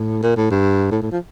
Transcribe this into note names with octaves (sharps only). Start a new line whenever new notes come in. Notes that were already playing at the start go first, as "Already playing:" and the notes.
Already playing: A2
A#2
A2
G2
A2
A2
F3